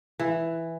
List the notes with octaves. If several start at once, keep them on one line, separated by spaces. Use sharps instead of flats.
E3